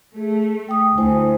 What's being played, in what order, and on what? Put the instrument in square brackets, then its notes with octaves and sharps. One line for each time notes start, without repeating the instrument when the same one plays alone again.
[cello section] A3 [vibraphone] G#4
[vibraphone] G5 D#6
[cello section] D2 [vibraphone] E4 C5 G#5